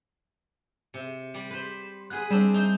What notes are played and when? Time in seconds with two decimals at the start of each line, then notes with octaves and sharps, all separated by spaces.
0.94 C3
1.34 G3 D5
1.50 B4 C5
2.10 B3 G#4 B4 F#6
2.31 G3 C4 D4 E5
2.54 D#4 C5